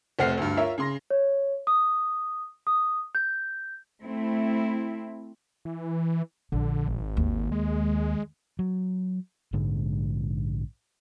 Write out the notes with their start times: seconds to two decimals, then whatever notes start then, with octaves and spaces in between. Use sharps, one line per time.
0.19 F1 A3 C5 F#5 F6 C7
0.38 D2 G2
0.57 F4 A#4 C#5 E5
0.78 C#3 C6 A#6
1.10 C#5
1.67 D#6
2.67 D#6
3.15 G6
4.03 A3 C4 E4
5.65 E3
6.52 A#1 D3
6.88 G#1
7.17 D#2
7.52 G#3
8.59 F#3
9.53 A#1 G#2 D3 G#3